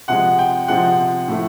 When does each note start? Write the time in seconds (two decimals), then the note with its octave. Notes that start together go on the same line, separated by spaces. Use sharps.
0.08 C3 F3 G#3 F#5
0.39 G5
0.68 C3 F3 G#3 F#5
1.28 A2 F3 A3